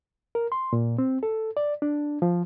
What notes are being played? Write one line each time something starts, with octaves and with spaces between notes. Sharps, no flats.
A#4
C6
A#2
C4
A4
D5
D4
F3